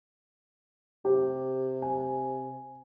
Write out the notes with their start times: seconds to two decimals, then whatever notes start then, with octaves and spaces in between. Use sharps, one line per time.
1.05 C3 G4
1.82 G#5